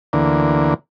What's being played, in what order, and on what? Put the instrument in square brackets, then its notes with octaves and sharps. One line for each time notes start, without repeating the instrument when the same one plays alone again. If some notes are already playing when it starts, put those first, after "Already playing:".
[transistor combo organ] D2 D3 E3 A#3